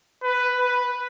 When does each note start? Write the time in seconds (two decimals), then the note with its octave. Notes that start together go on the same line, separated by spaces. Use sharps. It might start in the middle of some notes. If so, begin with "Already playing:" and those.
0.23 B4
0.59 B4